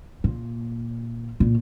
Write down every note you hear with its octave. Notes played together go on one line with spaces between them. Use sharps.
A#2
A#2